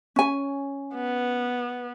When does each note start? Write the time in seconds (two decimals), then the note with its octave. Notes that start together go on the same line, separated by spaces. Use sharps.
0.16 C#4 G#5
0.95 B3